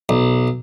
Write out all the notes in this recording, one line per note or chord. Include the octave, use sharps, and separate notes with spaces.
B1